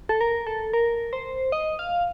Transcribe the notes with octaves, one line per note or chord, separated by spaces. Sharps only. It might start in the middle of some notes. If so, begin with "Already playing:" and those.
A4
A#4
A4
A#4
C5
D#5
F5